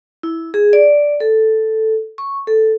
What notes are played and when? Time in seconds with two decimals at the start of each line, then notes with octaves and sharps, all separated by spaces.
0.23 E4
0.54 G#4
0.73 D5
1.20 A4
2.18 C#6
2.47 A4